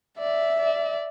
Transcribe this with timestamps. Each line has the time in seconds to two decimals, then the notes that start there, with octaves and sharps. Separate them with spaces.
0.19 D5 E5
0.60 D5